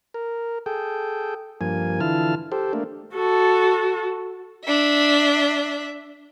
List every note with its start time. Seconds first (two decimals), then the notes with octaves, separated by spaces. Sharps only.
0.14 A#4
0.66 G#4 A4 G5
1.61 G2 F3 A#3 G#5
2.01 D3 E3 E4 F4 A5 F6
2.52 G4 A4 C5
2.73 A3 A#3 D4
3.15 F#4 A4
4.65 D4 E5